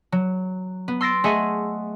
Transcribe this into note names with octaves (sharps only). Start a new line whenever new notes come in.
F#3
B3
C6 E6 A6 A#6 C7 D7
A3 G#4 D#5 E5 F#5 G#5